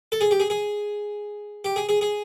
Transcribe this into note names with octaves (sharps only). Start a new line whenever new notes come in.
A4
G#4
G4
G#4
G#4
G4
G#4
G#4
G#4